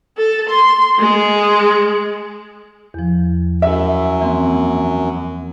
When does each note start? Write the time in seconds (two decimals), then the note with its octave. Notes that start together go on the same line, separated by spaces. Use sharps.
0.17 A4
0.50 C6
0.99 G#3
2.94 E2 F3
3.62 F#2 E5
4.21 E3 A#3 C4